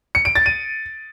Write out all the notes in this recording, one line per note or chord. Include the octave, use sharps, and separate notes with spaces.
C#7
D7
A6
D#7